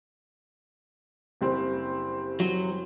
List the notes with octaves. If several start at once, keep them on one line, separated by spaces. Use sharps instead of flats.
F#1 G3 C4
F#3